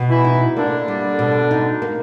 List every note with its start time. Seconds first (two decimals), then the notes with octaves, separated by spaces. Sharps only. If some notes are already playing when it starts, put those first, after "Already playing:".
Already playing: B2
0.09 E3 E4
0.25 D#4
0.56 D3 A#3 D4
0.88 G3
1.19 B2
1.51 D#4
1.82 A#3